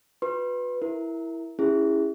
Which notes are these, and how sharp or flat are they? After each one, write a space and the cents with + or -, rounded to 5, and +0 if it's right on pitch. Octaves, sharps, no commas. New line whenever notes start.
F#4 -35 B4 +5 C6 +40
E4 +0 A#4 +0
C#4 +0 E4 +0 G#4 -25